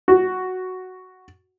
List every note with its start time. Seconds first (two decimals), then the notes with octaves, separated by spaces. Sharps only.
0.08 F#4